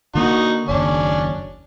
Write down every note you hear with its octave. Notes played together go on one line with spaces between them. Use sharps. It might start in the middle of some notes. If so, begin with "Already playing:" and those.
D3 A#3 D#4 F#4
F#1 D#2 C#4 D4